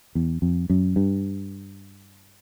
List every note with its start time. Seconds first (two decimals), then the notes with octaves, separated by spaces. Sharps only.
0.15 E2
0.42 F2
0.70 F#2
0.96 G2